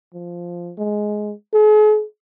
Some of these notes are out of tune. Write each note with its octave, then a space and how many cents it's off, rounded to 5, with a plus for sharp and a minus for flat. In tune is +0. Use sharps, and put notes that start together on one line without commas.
F3 -5
G#3 +10
G#4 +45